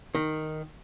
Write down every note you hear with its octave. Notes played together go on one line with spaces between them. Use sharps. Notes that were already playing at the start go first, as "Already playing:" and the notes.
D#3